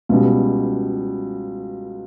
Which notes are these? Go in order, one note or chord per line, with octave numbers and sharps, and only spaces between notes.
C#2 B2 G3